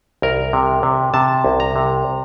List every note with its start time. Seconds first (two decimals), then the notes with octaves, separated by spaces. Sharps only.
0.22 C2 A#4
0.53 C3
0.83 C3
1.14 C3 A5
1.44 C2
1.60 A#5
1.76 C3